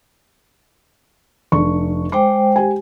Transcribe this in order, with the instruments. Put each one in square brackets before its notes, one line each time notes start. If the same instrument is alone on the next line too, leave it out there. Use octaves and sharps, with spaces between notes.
[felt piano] F1 D4 C#6
[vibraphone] G#3 C5 G5 [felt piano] D6
[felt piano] G4 G#5